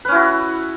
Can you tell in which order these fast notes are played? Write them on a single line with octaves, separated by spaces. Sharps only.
B4 C#4 E4 F#4